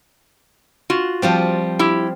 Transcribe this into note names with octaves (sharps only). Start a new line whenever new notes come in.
F4 F#4
F3 G3 C4
E4 G4